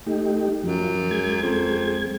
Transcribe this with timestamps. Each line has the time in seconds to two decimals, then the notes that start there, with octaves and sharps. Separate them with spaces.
0.06 A3 D#4 G4
0.64 F#2 F3
1.11 G#3 G#6
1.42 F2